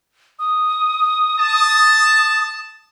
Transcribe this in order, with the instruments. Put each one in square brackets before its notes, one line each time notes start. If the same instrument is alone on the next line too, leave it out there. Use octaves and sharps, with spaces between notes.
[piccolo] D#6
[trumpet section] A5